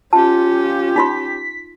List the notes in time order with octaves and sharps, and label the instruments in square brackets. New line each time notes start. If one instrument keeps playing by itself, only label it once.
[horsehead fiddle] C#4 G4 [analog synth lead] F4 [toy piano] A5
[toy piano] D#4 F4 C6 [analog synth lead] B6